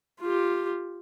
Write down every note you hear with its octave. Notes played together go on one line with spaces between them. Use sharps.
F4 G4